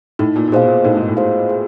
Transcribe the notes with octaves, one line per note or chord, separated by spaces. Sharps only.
A2 D#4
A#2
A#2
B2 G#4 C5 F5
A#2
A2 D#4
G#2
A2
G#4 C5 F5
G#4